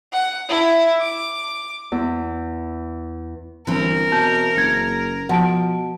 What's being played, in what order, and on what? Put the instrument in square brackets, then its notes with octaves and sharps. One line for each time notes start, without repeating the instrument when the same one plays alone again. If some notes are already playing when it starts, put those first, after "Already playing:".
[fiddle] F#5
E4
D6
[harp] E2
[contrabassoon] G1 [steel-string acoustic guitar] E3 C4 [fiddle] A#4
[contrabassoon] B2 [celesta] A5 G6
[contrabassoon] F#1 [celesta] G#6 C#7
[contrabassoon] B2 [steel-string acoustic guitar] F3 [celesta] F#5 A5 D7